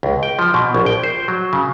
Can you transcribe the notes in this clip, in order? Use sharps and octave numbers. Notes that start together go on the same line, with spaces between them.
C#2
G5
F3
B2
A#1
G5
C5
F#3
C#3